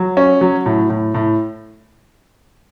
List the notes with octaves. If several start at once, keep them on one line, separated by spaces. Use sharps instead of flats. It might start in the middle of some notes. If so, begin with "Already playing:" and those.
Already playing: F#3
C#4
F#3
A2
A2
A2